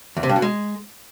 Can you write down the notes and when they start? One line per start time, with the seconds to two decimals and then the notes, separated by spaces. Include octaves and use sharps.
0.17 E2
0.23 C3
0.29 G2
0.36 B2
0.42 G#3